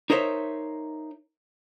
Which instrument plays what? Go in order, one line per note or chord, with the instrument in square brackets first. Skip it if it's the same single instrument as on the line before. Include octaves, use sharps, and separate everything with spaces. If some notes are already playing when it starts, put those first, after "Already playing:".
[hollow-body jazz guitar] D#4 A#4 C5 C#5 E5